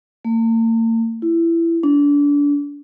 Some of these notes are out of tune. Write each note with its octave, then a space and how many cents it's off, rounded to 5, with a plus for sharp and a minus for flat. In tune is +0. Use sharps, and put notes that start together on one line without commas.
A#3 -45
E4 +20
D4 -30